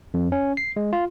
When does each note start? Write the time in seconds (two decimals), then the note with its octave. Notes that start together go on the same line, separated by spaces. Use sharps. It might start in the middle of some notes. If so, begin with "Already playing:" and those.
0.14 F2
0.32 C#4
0.57 C7
0.76 G#3
0.93 F4